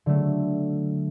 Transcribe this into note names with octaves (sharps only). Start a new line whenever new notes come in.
D3 F#3 A3